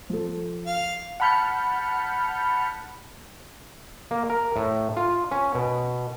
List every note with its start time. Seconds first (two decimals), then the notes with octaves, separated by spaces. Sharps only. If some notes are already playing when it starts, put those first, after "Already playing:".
0.10 F3 A4
0.66 F5
1.20 F#5 A5 B5 F6 G6 C#7
4.11 A#3
4.30 A#4
4.56 A2
4.97 F4
5.31 C#4
5.55 B2